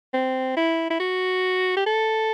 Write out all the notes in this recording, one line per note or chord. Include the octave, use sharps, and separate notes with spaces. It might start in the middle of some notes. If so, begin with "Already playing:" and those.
C4
E4
E4
F#4
G4
A4